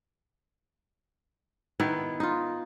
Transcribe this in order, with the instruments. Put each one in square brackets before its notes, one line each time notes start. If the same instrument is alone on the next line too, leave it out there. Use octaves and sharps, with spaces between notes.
[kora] D#3 B3 E4
D#4 F4